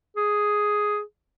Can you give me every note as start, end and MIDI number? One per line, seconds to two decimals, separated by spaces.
0.17 1.01 68